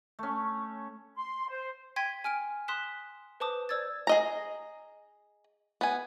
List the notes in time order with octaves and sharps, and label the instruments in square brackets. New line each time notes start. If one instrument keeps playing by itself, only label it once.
[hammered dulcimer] A3 C#4
[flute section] C6
C5
[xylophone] G5 C6 G#6 B6 D#7
G#5 F6 D7 D#7
C6 D#6 F#6 B6 E7
B4 C5 A5 D6 D#6
C5 D5 E6 G#6 A6
[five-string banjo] G#4 D#5 A#5
B3 G#5